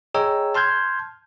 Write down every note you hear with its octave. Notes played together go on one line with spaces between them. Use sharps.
G#4 C#5 D#5 G5 A#5 E6
A5 C6 F6 G6 G#6